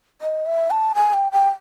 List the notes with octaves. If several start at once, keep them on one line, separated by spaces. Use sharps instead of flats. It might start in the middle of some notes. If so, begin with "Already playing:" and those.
D#5
E5
A5
G#5
G5
G5